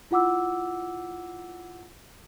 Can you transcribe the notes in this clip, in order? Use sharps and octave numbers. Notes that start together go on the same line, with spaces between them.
E4 F4 F#5 D6 E6